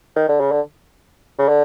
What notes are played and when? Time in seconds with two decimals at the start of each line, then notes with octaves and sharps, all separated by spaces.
0.16 D#3
0.29 D3
0.40 C#3
0.51 D3
1.39 C#3
1.48 D3